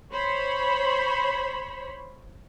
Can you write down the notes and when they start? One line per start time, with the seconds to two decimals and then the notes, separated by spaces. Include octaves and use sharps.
0.12 C5 C#5 B5